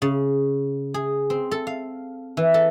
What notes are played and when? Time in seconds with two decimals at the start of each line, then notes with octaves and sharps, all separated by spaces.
0.02 C#3
0.94 G#4
1.30 C4
1.51 A4
1.67 F5
2.37 E3
2.54 A4